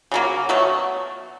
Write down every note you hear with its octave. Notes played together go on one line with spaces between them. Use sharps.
C#3 F#3 A#3
B2 F#3 A3